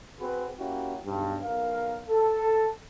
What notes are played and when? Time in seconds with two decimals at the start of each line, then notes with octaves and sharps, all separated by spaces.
0.20 C4 F#4 G#4 B4
0.59 A#3 C#4 E4 F#4 G4
1.06 B1 G2
1.44 B1 A#4 F5
2.09 A4